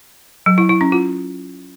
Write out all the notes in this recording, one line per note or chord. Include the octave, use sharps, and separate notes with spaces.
F#3
E4
E4
C#4
F4